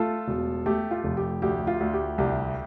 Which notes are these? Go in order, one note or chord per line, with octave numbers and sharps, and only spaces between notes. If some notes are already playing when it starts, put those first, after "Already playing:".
Already playing: A3 F4 A4
E1
A3 G4
F4
F1
G4
D2 G4
F4
D2
G4
C2 G4